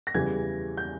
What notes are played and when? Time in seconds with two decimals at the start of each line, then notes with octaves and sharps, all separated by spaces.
0.07 A#6
0.14 E2 C#3 E3 G3 G#6
0.77 G6